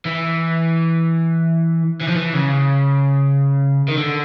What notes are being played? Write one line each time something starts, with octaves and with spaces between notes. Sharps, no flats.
E3
E3
F3
E3
C#3
D#3
D3